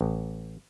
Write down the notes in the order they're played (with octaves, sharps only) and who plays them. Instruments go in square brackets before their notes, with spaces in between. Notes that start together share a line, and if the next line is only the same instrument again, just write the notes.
[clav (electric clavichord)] A1